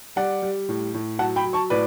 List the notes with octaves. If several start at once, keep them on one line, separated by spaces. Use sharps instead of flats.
G3 D5 F#5
G3
A2
A2
F#3 F#5 A5
G5 B5
F#3
A5 C#6
A2 B4 D5